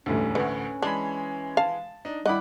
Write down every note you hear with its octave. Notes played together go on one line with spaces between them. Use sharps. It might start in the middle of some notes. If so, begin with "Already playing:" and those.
E1 A1 D2 G2 C#4
A1 D2 A2 D3 B4
E3 G#3 D4 B5
F5 A5
D4 D#4
G3 E4 D#5 F#5 B5 D6 F#6